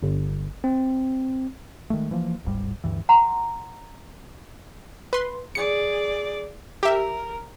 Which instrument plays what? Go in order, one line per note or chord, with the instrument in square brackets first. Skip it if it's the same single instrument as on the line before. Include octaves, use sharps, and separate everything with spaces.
[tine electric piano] G1
C4
[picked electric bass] D#3 G#3 A3
E3 F3 A#3
D1 G1 G#2 G3
D2 G2 E3
[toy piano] F#5 A#5 C6
[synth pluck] B4 C6
[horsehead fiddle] G#4 D5 [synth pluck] C#7
[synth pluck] G4 E5 [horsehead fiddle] A#4